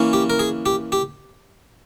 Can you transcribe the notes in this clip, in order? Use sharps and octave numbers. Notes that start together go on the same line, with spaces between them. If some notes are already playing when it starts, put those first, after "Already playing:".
Already playing: E3 A#3 C#4
G4
A#4
G#4
G4
G4